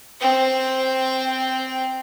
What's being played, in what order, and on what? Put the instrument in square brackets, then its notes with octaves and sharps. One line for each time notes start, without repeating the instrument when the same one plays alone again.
[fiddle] C4 G5